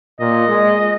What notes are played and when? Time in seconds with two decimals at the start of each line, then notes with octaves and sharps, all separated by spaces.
0.20 A#2 D#5
0.48 G#3